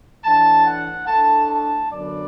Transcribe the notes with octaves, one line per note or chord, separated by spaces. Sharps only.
A2 E3 D4 A5
F#5
A2 A3 D4 A5
A5
F#2 D3 F#3 B3 D5